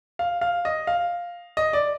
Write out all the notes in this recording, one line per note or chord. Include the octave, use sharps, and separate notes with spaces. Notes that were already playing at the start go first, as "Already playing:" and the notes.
F5
F5
D#5
F5
D#5
D5